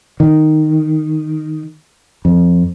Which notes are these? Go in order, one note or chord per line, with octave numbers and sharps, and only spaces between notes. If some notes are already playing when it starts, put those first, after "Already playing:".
D#3
F2